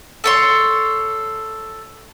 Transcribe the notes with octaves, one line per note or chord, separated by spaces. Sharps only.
A4 C#5 C6